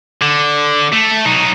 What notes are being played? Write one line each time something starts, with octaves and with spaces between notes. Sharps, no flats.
D3
A3
F#3 D#4